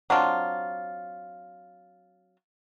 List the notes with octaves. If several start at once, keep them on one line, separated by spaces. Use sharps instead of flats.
F#3 C4 D4 F4